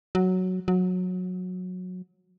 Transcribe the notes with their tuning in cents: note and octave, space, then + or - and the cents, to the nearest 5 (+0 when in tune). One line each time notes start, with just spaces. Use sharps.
F#3 +0
F#3 -20